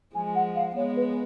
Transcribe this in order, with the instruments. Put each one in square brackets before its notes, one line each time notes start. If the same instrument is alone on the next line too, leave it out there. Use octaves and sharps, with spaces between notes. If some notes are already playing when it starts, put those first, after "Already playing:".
[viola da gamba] F3 G#3 [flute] G#5
[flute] F#5
F5
[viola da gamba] G#3 B3 [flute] C#5
[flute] B4